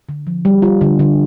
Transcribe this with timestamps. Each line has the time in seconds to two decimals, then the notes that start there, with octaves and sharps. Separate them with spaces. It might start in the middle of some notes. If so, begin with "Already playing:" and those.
0.09 D3
0.27 F3
0.45 G3
0.62 F4
0.81 D3
0.99 D3